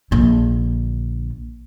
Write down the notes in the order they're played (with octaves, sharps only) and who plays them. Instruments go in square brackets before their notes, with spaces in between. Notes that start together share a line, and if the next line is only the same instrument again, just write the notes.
[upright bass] A#1 D3